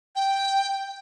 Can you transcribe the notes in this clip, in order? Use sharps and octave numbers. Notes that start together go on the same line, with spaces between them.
G5